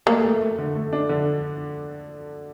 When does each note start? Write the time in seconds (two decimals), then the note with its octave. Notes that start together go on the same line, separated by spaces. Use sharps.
0.06 A3 A#3
0.23 A3
0.41 A3
0.58 D3
0.75 A3
0.93 D4
1.09 D3